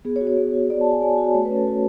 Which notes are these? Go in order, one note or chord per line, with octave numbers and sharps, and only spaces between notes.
B3 G#4
C#5
F#4
C#5
B3
F#4
B3 D5
A5
F#4 G#5
B3 G#5
A5
F#4
A5
A3 C#5
B4
C#4
A4
F#4